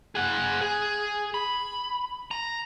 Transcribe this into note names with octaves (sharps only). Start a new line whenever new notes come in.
G#4 F#5
G#4
B5
A#5